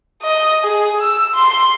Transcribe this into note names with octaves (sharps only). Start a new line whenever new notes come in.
D#5
G#4
E6
C6